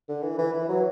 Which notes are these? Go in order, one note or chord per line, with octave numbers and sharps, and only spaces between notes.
D3
E3
E3
E3
F#3